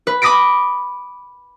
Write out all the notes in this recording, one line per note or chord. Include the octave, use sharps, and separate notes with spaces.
B4
B5 D6 D#6 A#6 B6 D7